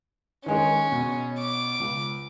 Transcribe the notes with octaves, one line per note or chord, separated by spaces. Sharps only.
D#3 G#3 C#4 D#4
B2
D6
C#2